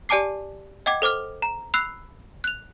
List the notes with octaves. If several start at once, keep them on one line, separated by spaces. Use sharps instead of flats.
G4 D5 G#5 A5 D6 C7
D#5 F#5 G5 D6 G#6
A4 C5 D6 F6
A#5
B5 E6 F#6 C7 F7
F#6 F7